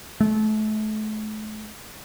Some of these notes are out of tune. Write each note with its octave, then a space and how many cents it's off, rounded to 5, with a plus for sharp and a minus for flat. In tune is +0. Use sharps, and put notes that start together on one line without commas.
A3 -35